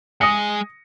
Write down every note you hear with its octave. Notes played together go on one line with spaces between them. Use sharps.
G#3 D#6 A#6 C#7